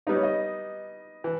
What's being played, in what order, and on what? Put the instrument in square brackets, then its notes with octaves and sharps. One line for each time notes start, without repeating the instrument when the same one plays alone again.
[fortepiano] G3 B3 D#4 [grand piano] D#5
[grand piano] C#5
D#5
[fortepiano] E3